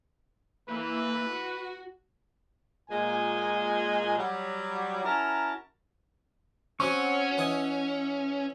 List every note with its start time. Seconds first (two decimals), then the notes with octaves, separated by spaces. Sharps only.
0.69 E3 A#3 B4
1.28 F#4
2.90 A#2 G#3 G#5
4.18 F#3 G3
5.04 C#4 E4 F#4 A#4 A5 A#5
6.80 F#3 C4 C#4 F#5 C#6
7.38 E3 C#5 D#5